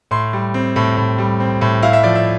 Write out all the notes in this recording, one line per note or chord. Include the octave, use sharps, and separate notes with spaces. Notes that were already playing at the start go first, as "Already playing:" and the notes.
A2 C6
G3
C4
A2
A2
G3
C4
A2
E4 F5
E5
F3 D5
E5